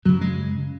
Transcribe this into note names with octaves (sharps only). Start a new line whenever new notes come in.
F#2 C#3 F#3
G#3